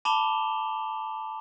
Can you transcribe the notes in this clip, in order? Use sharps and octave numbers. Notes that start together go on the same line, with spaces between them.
A5 B5 D6 E7 F7 G7